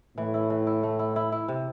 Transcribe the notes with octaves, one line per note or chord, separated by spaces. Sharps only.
A2 E3
E4
E3
E4
A3
E4
E4
E4
C3